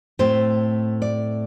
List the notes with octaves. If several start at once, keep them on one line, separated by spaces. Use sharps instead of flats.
A2 A3 C4 C5
D5